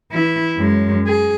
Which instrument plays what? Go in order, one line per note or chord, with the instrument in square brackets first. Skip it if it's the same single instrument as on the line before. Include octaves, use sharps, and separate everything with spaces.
[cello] E3 E4
F#2 G#3
G#4